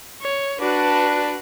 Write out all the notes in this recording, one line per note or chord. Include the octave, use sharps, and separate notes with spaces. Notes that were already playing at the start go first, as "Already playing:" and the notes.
C#5
D4 F#4 B4